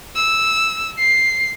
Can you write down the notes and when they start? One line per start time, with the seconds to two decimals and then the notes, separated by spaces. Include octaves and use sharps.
0.15 E6
0.99 C7